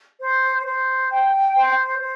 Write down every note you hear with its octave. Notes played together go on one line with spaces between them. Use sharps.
C5
C5
G5
C5
C5